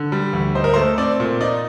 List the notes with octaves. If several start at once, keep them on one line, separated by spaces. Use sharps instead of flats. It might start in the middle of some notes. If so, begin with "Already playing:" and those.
Already playing: D3
G3
D2
D#4 C5
A#4
A3 C5
C4 D5
A#2
D#4 D5